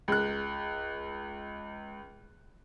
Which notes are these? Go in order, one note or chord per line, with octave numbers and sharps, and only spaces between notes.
C#2 F#6